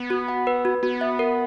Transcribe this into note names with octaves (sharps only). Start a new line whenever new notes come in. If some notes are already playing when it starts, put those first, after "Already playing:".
Already playing: B3
F#4
F#5
B4
F#4
B3 F#4
E5
A#4